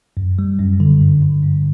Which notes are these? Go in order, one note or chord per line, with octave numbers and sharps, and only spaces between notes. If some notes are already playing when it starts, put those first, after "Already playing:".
F#2
G3
F#2
D3
G2
D3
G2